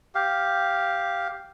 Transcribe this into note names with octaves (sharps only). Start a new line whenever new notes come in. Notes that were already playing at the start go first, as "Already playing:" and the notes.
G4 F5